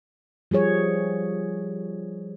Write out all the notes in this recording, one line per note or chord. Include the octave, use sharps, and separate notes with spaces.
F3 G3 G#4 C#5